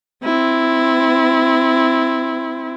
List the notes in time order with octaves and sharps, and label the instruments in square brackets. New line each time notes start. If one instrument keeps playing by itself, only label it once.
[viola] C4 E4